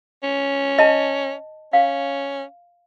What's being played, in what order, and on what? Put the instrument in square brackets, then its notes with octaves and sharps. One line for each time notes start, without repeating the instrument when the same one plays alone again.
[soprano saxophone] C#4
[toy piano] D#5 A5
[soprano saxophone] C#4 [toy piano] F5